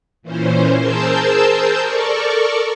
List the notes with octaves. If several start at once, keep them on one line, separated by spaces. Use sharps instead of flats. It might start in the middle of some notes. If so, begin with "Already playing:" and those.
A#2 E3 C#4 C5
G#4 A#4 C5 A5 E6 G6
A4 A#4 D5 C#6